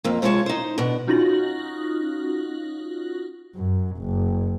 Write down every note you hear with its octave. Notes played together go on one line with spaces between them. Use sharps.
F2 A#3
C3 G#3 F4 F#4 C#5 A5
D#4 C5
B2 D4
C#4 D#4 F4 F#4 A#6 F#7
F#2
F#1